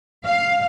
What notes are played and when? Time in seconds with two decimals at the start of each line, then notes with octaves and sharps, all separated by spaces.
0.25 F5